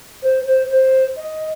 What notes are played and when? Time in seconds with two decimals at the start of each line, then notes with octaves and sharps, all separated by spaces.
0.22 C5
0.45 C5
0.70 C5
1.16 D#5